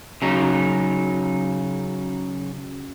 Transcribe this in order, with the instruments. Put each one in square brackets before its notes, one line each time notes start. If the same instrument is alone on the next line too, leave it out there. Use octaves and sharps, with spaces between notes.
[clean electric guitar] C#3 F#3 D#4